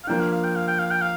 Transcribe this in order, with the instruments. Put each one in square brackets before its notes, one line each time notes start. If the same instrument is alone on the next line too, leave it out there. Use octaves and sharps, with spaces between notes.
[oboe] F5
[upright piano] F3 A#3 D4 [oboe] G5
[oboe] F5
F5
G5
F5
G5
F5
G5
F5